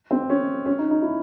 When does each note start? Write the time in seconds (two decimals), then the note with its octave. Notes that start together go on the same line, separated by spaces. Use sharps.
0.11 C4
0.30 C#4
0.66 C#4
0.79 D#4
0.91 D#4
1.02 E4